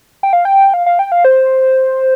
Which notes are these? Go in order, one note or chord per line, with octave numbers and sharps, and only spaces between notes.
G5
F5
G5
F5
F5
G5
F5
C5